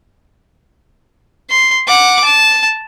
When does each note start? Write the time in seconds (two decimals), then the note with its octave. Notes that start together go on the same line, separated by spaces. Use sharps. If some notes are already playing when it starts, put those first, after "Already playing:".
1.50 C6
1.87 F#5 D6
2.24 A5